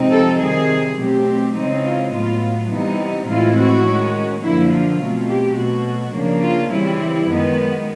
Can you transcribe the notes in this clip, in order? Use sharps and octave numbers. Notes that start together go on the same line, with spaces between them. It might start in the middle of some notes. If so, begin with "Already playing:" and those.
Already playing: C3 F3 G#3 C4 D#4
A4
C3 D#3 G3 G#4
B2 F#3 A3 C4 G4
C#3 E3 G#3 C4 D#4
F4
A2 F#3 B3 F4
C3 E3 G3 B3 D#4
A2 E3 G#3 C4 E4 F4
F#4
D#3 G#3 C#4
F#2 D3 F3 A#3 E4
F4
B2 F#3 A3 C4
G4
B2 F#3 A3 F#4
C#3 F3 A#3 D4
F4
C#3 E3 G3 C4 E4
E4
F#2 D#3 G#3 B3